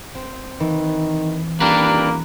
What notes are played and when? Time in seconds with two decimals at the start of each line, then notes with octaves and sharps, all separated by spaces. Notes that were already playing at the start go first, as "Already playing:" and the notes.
0.15 C4
0.60 D#3 E3
1.60 D#1 A#3 D4 G4 B4 A#5 B5 F#6